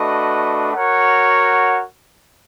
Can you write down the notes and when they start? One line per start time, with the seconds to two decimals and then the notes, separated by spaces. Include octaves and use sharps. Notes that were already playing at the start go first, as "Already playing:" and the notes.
Already playing: A3 D4 F#4 B4 D#5
0.74 F#4 A#4 C#5 F#5